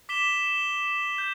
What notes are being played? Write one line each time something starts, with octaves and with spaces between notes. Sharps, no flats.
D6 B6 E7 G7
G6